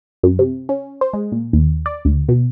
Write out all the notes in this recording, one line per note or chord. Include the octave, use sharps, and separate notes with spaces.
F#2
C3
C#4
C5
G#3
A#2
D#2
D5
D2
B2